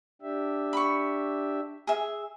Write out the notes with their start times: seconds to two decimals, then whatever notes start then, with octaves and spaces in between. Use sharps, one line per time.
0.22 D4 G4 E5
0.73 B5 C#6
1.87 G#4 E5